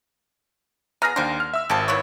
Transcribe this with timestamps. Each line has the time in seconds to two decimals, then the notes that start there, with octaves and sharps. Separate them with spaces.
1.02 B3 G#4 A#5 F6 A#6
1.16 D#2 D3 D4 C5
1.40 F6
1.54 E5 E6
1.70 G#1 F3 G4 A5
1.88 B3 E4 C#5